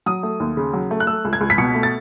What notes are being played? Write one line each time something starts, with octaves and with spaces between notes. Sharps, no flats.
F#3 D#6
A3
D#2
C#3
F#3
A3
F#6
A3 E6
C#2
G#6
C#2
B6
B2 C#7
A3
A6